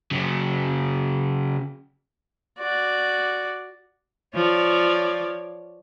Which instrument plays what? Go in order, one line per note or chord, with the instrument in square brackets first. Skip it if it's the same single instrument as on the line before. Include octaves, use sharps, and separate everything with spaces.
[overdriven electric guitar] C#3 F#3
[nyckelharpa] F#4 D5
[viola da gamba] F3 C#5 D5